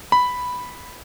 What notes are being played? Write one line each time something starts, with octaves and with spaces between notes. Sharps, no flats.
B5